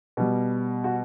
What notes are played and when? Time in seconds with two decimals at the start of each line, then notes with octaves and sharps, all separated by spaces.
0.17 B2 G3
0.84 F#4